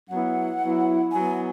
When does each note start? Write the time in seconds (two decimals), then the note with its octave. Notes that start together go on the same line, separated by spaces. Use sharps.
0.09 F#3 B3 E4 F#5
0.60 F#3 B3 E4
1.12 F#3 B3 E4 G#5